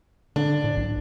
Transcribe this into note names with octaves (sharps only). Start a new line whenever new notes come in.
D3 D4
A2
B1